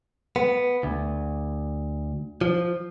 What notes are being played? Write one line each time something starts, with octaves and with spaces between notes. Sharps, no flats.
B3
D2
F3